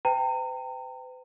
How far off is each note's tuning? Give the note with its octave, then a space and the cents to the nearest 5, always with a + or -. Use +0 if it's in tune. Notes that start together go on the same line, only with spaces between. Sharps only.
B4 +45 G5 +0 A#5 -35